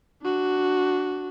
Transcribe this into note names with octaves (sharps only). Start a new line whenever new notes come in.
D4 F#4